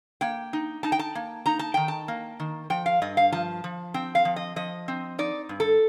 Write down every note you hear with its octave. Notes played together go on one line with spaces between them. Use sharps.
A#3 G5
D#4
D#4 A5
G5
A5
A#3
D#4 A#5
A5
D#3 G5
A5
A#3
D#3
F3 G5
F5
G2 D#5
F5
F3 A5
F3
C4 G5
F5
F3
D#5
F3 D#5
C4
D#4 D5
G2
A4